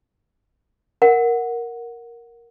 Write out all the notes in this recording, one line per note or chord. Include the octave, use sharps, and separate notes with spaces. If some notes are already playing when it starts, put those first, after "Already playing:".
A#4 F#5